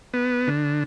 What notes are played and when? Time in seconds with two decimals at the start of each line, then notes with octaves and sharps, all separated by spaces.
0.14 B3
0.47 D3